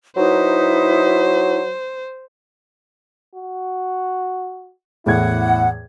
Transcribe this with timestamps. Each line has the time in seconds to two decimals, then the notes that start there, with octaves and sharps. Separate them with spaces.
0.17 F#3 D#4 E4 B4 C5
3.35 F#4
5.06 E2 A2 E4 F#5 G#6